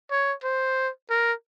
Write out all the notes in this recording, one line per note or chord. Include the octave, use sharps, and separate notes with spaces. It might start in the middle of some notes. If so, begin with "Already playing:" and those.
C#5
C5
A#4